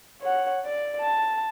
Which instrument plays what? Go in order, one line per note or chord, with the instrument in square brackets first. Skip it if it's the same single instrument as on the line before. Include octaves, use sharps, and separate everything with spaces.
[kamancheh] C#5 F#5
D5
A5